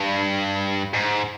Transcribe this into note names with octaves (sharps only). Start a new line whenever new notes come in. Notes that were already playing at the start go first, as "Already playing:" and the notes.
Already playing: G2
G#2